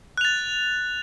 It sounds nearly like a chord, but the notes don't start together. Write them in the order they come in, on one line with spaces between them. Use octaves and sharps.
F#6 F7 A6